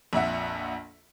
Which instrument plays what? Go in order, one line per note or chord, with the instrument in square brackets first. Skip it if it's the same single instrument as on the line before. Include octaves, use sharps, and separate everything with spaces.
[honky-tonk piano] A#1 F2 E5 F#5